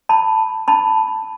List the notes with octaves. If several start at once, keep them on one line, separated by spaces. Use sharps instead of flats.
A5 B5
A5 B5